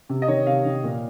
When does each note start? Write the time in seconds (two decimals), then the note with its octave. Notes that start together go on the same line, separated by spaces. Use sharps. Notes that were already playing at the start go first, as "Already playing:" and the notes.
0.09 C3
0.22 D#5
0.28 D#3 C#5
0.47 C3 F5
0.65 D#3
0.84 A#2